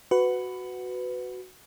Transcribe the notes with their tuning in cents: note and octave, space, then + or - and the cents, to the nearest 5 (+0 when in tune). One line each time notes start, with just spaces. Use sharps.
F#4 +0 B4 +15